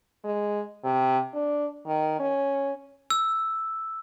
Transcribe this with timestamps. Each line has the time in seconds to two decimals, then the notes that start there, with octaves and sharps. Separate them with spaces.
0.24 G#3
0.84 C3
1.34 D4
1.87 D#3
2.19 C#4
3.10 E6